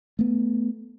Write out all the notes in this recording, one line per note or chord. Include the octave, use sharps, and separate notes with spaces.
A3 B3